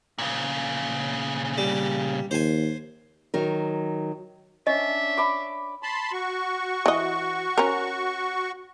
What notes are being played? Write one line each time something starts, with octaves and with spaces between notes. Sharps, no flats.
A#2 C#3
G3
D#2 C5 G#5
D#3 F#3 A#4
C#4 D4 D#5 E5
B5 D6
A5 B5 C6
F#4 C#6
E3 D#5
C#4 A#4